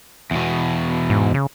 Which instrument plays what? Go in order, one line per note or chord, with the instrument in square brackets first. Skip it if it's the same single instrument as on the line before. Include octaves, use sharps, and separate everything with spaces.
[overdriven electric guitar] E2 B2
[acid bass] G#2
C#3